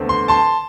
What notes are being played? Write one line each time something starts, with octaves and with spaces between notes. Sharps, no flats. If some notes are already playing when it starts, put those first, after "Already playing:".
Already playing: E2 D3 A3 C4
C6
A5 C6